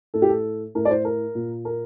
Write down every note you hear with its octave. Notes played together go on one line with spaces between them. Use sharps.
A2 A4
G4
A4
A2 A#4
D5
C5
A#4
A#2
A#4